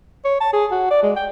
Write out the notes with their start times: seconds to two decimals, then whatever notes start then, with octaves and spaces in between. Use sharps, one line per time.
0.24 C#5
0.40 A5
0.53 G#4
0.71 F#4
0.91 D5
1.03 G#3
1.16 G5